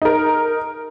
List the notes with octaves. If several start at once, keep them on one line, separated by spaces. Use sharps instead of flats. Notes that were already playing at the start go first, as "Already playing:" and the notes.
D#4 A#4